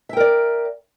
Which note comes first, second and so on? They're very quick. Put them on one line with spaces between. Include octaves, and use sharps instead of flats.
E5 G5 A#4 D5